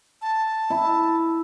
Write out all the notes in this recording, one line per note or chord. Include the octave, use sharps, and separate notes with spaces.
A5
E4